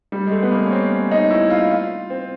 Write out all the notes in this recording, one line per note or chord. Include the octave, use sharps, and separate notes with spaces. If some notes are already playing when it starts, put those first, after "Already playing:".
G3
G#3
A3
B3
A#3
C#4
C4
C#4
D#4
E4
F4
F4
C4